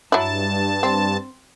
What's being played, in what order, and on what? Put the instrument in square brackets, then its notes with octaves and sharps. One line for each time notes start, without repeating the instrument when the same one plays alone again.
[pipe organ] G2 A5 [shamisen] F#3 E4
[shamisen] C4